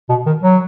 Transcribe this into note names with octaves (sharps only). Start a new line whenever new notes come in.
B2
D#3
F#3